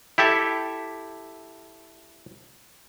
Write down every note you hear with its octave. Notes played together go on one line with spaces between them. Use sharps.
E4 G4 A4 E5